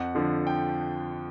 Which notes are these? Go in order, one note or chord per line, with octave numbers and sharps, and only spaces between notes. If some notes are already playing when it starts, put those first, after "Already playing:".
Already playing: F2 F#5
D3 F3
G5